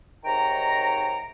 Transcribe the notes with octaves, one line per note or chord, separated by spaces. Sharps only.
G#2 C3 D#3 C#5 G5 A#5